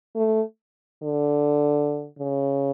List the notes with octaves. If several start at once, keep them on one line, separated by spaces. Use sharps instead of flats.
A3
D3
C#3